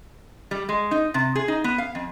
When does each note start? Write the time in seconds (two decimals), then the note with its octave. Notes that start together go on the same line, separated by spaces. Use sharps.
0.51 G3
0.69 G#3
0.91 D#4
1.14 C3
1.35 G#4
1.48 D#4
1.64 B3
1.78 F5
1.95 F2